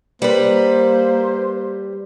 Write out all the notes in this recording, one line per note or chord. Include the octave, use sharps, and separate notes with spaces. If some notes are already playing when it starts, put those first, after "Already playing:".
G3 A#3 B4 C5